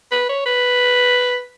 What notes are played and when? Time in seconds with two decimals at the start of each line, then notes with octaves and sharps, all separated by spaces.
0.11 B4
0.29 C#5
0.46 B4